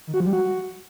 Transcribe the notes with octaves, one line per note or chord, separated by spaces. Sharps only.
D#3
F#4
F3
G3
F#4